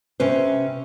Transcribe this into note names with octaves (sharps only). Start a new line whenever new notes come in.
C3 C#4 B4 C5